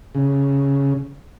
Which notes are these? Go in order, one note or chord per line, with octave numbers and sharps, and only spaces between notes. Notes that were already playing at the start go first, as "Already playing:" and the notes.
C#3